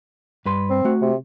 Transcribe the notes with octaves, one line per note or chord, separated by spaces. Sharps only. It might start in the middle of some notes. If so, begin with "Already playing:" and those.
G2 B4 C6
C4
A3 F#4
C3